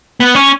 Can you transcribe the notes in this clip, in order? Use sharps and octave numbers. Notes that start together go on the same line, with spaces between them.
B3
C#4